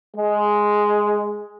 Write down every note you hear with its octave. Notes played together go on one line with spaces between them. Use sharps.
G#3